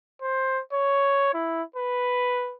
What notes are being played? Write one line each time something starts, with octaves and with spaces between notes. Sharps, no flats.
C5
C#5
E4
B4